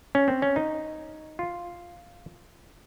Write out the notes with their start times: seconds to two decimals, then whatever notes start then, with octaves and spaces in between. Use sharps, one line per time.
0.15 C#4
0.28 C4
0.42 C#4
0.56 D#4
1.39 F4